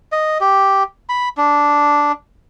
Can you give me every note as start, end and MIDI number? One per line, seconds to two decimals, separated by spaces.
0.12 0.38 75
0.41 0.83 67
1.09 1.29 83
1.37 2.12 62